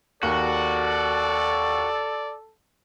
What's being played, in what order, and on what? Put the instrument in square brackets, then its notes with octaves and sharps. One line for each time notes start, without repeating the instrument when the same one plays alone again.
[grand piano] D#2 [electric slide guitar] F#4 [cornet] A4 [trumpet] D5